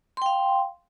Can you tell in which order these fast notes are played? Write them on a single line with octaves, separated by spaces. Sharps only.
C6 G5 F5